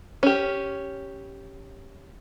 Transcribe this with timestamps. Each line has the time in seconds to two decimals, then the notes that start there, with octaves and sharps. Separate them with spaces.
0.23 C#4 G4